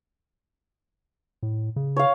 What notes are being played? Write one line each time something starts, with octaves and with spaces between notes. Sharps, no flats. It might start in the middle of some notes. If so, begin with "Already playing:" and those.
A2
C#3
C#5 F5